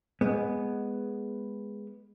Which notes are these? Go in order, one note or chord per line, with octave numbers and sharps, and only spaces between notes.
G#3 B3